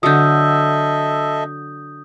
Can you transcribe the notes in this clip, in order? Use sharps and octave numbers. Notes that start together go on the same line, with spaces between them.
D3 F#3 A4 D#5 E5 D#6 G6